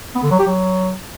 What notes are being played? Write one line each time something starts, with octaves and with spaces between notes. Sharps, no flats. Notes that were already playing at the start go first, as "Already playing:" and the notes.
B3
D3
F#3
G4
F#3